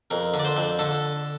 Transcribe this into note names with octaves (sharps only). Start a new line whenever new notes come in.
F2 A#4
D3
D5
C5
F2
D3 A4